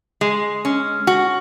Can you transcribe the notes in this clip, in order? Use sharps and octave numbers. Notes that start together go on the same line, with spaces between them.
G#3
C#4
F#4